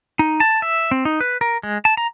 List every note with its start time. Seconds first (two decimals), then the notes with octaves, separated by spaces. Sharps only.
0.19 D#4
0.40 A5
0.62 E5
0.91 C4
1.05 D#4
1.20 B4
1.41 A#4
1.63 G#3
1.85 A5
1.97 A#5